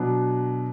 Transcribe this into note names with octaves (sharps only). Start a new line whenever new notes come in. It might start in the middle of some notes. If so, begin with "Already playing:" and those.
Already playing: B2 F#3 B3 D4